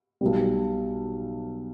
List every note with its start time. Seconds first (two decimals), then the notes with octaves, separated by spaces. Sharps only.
0.21 B1 B2 G3